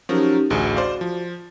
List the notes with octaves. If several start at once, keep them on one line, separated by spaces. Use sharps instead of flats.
F3 F#3 C#4 D#4 G4 A#4
A1 D2 F#4 G#4
C5 D5 F5
F3